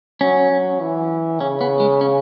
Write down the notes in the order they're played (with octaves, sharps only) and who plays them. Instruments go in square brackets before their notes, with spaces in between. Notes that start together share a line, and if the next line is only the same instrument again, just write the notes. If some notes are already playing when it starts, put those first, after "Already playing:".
[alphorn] F#3 [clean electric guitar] C#4
[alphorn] F#3
E3
[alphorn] C#3 [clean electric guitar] C#4
[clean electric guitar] B3
G#3
C#4